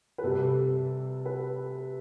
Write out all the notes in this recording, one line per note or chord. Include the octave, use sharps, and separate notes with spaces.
B4
C3 G3 A4
B4